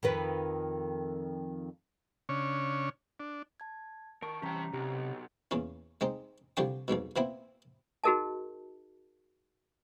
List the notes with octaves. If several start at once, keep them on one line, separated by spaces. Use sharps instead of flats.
F2 D#3 B4
C#3 C#4 D4 C#5
D4
A5 G#6
D#3 A#4 A5 C#6
C3 E3 G3 C#4 G4 G5 A#5
B1 C3 G4
E2 A#2 C#4
G#3 C4 D#4
C2 D3 F3 G4 G5 C#6
B1 F2 G#2 B2
A#2 B3 C4 E4
D#4 F#4 G#4 A#4 D#5 A5